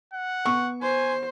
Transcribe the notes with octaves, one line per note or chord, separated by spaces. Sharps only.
F#5
B3 C#6
C5 G#5